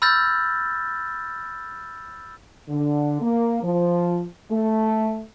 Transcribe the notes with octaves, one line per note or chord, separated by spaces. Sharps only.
B5 E6 F6 G6 A6 A#6
D3
A#3
F3
A3